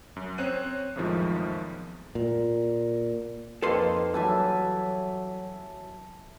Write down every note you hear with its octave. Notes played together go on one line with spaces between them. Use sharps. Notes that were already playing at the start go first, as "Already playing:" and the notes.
F#2
C4 C5 C#5 F#6 D#7
B1 F2 A2 D#3 F3 G#3
A#2
F2 A#3 D#4 A4 B4 C6
E3 F#3 G3 E5 G#5 A5